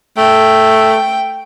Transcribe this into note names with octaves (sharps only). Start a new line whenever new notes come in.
A3 G5